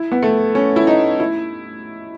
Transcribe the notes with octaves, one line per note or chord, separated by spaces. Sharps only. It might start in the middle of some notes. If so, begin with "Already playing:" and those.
Already playing: E4
B3
A3
C#4
E4
D#4
E4